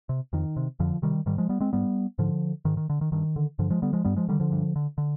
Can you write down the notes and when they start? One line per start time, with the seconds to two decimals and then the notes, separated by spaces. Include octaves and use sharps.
0.09 C3
0.33 F2 D#3
0.57 C3
0.80 F2 D3 F3
1.02 C3 D#3 G3
1.26 G#2 D#3 G3
1.38 F3 G#3
1.49 G3 B3
1.60 G#3 C4
1.73 G#2 G3 B3
2.19 G#2 D3 F3
2.65 G#2 D#3
2.77 D#3
2.90 D3
3.01 D#3
3.12 G2 D#3
3.36 D3
3.59 G2 D3 F3
3.70 F3 G#3
3.82 D3 G3 B3
3.93 F3 G#3
4.04 G2 G3 B3
4.16 F3 G#3
4.29 D3 D#3 G3
4.40 D3 F3
4.52 G2
4.76 D3
4.98 D3